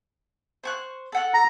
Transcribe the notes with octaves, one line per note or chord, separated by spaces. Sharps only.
C5 C#6 F#6
A4 F#5 F#6
A#5